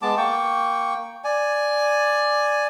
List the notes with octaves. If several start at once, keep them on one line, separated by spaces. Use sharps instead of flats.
G#3 B3 A5 D6
A#3 G5 C#6
D5 G#5